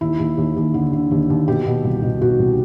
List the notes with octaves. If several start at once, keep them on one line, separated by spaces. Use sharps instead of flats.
D#2 E4
D#2
D#2
D#2
D3
D3
D#2
D#2
B2 G4
B2
C2
B2
B2 F#4
C2